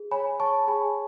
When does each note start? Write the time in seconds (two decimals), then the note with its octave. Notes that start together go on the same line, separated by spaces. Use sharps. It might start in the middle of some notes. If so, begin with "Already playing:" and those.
Already playing: G#4
0.11 C#5 G#5 B5
0.40 C#5 A5 C#6
0.68 G#4 G#5 B5